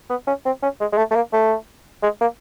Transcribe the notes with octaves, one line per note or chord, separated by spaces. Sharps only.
B3
C#4
C4
C#4
G#3
G#3
A3
A3
A#3
A3
G#3
A#3